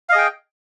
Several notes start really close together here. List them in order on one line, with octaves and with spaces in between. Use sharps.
F5 D#5 G#4 G5